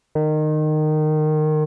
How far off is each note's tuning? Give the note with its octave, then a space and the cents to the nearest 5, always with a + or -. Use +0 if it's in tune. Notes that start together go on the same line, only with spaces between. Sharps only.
D#3 -20